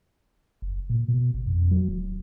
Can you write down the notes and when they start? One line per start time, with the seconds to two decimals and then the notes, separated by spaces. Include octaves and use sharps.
0.62 F#1
0.90 A#2
1.08 B2
1.34 G#1
1.46 F2
1.71 F#3
1.88 D1